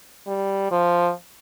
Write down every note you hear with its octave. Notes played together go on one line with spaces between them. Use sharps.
G3
F3